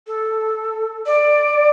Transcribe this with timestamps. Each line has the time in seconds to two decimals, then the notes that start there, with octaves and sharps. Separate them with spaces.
0.07 A4
1.06 D5